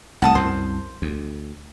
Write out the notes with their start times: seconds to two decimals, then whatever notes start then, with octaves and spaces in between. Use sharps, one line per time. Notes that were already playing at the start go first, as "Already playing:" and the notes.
0.22 C2 A3 F#5 A5 D#6
0.35 C2 F#2 C5
1.02 D2